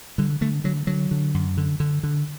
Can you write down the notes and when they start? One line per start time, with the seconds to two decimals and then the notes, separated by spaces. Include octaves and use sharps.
0.18 D3 G3
0.41 D3 A3
0.64 D3 F#3
0.87 D3 F#3
1.11 D3
1.34 F#2
1.57 D3
1.80 D3
2.03 D3